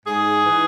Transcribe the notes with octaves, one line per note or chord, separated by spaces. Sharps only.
G#2 G#4
E3